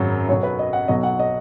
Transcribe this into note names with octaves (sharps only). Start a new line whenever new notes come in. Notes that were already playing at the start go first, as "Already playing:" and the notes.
Already playing: G#1 F#2 C#3 F#3
B1 B2 F#3 C#5
B4
D#5
F#5
B1 B2 F#3 D#5
F#5
D#5